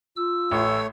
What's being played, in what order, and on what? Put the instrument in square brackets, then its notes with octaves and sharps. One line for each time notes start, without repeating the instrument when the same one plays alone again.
[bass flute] F4 [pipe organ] E6
[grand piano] A1 [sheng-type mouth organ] A3 C#5